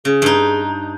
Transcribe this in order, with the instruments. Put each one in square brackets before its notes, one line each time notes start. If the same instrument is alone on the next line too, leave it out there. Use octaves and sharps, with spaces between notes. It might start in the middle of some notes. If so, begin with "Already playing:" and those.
[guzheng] C#3 [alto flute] G#4
[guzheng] G2 D#4